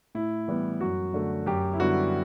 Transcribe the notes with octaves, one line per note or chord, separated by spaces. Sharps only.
A2 E4
E3 G3 B3
F#2 F#4
D3 A3
F#2 G4
E4
D3 G3 B3 F#4